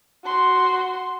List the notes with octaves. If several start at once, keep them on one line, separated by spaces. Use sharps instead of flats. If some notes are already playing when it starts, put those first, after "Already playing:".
F#4 C6